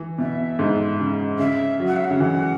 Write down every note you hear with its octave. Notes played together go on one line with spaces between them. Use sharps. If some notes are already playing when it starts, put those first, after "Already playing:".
Already playing: E3
B2 E5
G#2
C#3
C#3 E5
F#3
F#5
E5
F#5
C#3
E3